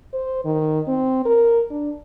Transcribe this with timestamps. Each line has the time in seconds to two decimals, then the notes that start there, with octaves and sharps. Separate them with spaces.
0.14 C5
0.45 D#3
0.88 C4
1.26 A#4
1.71 D4